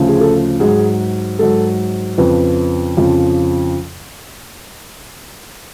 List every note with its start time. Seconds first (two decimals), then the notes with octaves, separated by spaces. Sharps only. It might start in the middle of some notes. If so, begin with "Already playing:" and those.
Already playing: D2 C#3 F3
0.09 G#4
0.21 A4
0.60 G#2 F#3 G#4
1.39 G#2 F#3 A4
2.18 F2 C#3 F3 B4
2.97 F2 C#3 F3